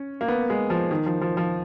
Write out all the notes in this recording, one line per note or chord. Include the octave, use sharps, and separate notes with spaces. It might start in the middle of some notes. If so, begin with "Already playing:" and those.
Already playing: C#4
A#3
B3
G#3
F3
D#3
F3
F3
F3